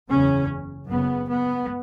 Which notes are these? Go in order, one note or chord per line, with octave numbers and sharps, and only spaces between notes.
F#1 E2 C#3 C#4
F#1 F#2 C#3 B3
B3